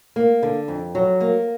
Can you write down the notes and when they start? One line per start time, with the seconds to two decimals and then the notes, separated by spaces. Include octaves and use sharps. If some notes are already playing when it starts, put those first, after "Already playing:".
0.16 A#3
0.43 D3
0.68 F2
0.95 F#3
1.20 A#3